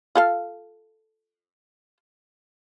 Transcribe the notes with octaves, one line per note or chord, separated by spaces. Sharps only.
F4 A4 F5